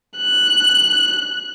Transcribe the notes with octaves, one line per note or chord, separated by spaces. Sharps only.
F#6